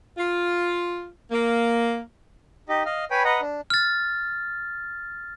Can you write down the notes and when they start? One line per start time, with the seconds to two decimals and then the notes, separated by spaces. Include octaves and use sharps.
0.18 F4
1.31 A#3
2.69 D#4 G4 D#5
2.86 D#5 F5
3.11 B4 C#5 G5 G#5 B5
3.24 B4 D#5 F#5 A#5
3.41 D4
3.70 F6 A6